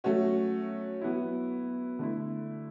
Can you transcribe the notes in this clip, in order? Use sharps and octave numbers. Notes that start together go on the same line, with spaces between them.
F#3 A3 C#4 F#4
F#3 B3 E4
D3 A3 E4